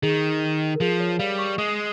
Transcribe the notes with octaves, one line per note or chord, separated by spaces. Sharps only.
D#3 G#4
A#4
F3 G#4
C#5
G3 F5
C#6
G#3 D#6